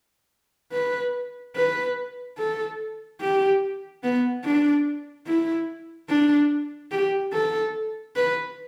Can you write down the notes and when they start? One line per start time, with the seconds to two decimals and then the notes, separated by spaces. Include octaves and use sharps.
0.72 B4
1.56 B4
2.38 A4
3.21 G4
4.03 B3
4.44 D4
5.27 E4
6.09 D4
6.92 G4
7.33 A4
8.16 B4